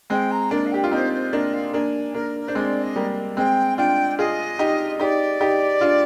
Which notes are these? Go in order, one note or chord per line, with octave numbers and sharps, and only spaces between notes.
G#3 C4 G5
A#5
A#3 D4 D5
F5
G4 G5
F4
C4 D#4 C5
C5
A#3 D4 D#5
F5
A#3 D4 G#5
A#3 D4 A#4
A#4
D4 C5
G#3 C4 D5
D#5
G3 A#3
G#3 C4 G5
D4 F4 G5
F4 G#4 D#5
D#4 G4
D#4 G4 D5
D#4 G4
D4 F4